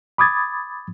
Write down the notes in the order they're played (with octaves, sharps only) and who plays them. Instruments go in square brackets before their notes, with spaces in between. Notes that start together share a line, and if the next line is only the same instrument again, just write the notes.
[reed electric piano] B5 D6 D#6 G#6 A6